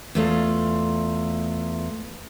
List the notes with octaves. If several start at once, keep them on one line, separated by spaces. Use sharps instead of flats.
E2 A3 F4